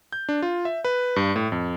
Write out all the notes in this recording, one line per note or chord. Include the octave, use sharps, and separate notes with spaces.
G6
D4
F4
E5
B4
G2
A2
F2